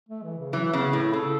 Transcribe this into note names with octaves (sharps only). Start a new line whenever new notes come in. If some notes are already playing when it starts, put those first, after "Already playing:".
A3
E3
C#3
E3 F#3
C#3 B3
A2 E4
C#3 A4